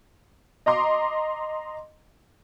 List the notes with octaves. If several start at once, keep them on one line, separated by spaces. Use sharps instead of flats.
D#5 A#5 C6 D6